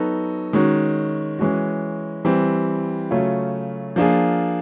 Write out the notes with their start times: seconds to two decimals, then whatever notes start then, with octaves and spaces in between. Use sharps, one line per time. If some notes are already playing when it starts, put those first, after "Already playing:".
Already playing: F#3 B3 D#4 F#4 A4
0.53 D#3 G#3 C#4 F#4
1.39 E3 G#3 C#4 F#4
2.25 E3 G3 C4
3.11 C#3 F#3 A3 C#4 F4
3.96 F3 A#3 D4 F4 G#4